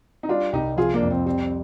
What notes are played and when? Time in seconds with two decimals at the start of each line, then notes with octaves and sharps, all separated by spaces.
0.23 D#4
0.29 G3 D4 F4
0.52 C2 D#4 G4
0.77 F3 F4 G#4
0.94 A#3 D4
1.02 F2
1.10 C4
1.26 G3 C4
1.40 C4